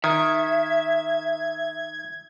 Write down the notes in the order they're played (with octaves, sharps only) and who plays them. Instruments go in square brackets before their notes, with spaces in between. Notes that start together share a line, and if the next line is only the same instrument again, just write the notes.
[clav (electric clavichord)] D#3 [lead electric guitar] E5 [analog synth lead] G#6